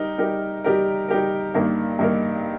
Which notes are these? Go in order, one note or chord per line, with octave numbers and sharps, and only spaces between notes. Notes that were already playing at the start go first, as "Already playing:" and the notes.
Already playing: G3 D#4 G4 A#4
G3 D#4 G4 A#4
G3 D#4 G4 A#4
G3 D#4 G4 A#4
G2 D#3 A#3 D#4 A#4
G2 D#3 A#3 D#4 A#4